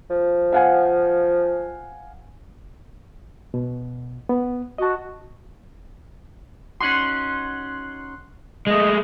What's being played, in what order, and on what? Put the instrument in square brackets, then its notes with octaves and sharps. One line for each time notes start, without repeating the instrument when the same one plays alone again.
[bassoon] F3
[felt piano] F5 F#5 G#5
[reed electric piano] B2
B3
[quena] F#4 [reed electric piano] D#5 A5
[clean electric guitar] C#4 D#4 F#4 [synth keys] C6 F#6
[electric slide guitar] G#3 A3 [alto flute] D#5